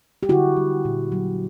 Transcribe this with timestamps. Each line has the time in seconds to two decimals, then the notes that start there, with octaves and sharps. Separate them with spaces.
0.23 G4
0.29 D3 E4 F#4
0.57 G3
0.85 A#2
1.12 F#3